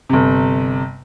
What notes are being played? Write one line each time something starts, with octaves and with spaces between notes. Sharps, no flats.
G1 C3